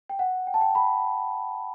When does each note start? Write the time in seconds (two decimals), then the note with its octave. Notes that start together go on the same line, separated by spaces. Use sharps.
0.09 G5
0.19 F#5
0.47 G5
0.54 A5
0.61 G5
0.75 B5